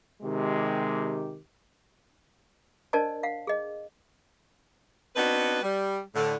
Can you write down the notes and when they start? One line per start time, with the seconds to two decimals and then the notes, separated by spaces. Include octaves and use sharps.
0.23 C3 D#3 G#3 G4
2.93 D4 A#4 C5 D5 D#5 A5
3.23 F5 F#5
3.47 G#4 D#5
5.16 B3 C4 D4 D#4 F#4 B4
5.62 G3
6.15 A2 D3